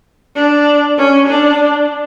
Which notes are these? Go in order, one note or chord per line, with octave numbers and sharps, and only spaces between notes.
D4
C#4
D4